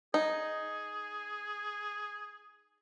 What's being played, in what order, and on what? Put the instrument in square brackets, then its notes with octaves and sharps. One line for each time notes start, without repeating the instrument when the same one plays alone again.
[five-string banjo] D#4 [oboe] G#4